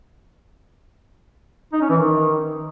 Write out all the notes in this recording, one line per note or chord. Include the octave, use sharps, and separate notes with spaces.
D#4
C#4
E3
D#3